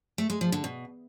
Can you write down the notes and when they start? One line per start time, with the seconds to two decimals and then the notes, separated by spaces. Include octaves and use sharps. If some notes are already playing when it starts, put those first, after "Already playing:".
0.18 A3
0.30 G#3
0.41 F3
0.52 D3
0.64 B2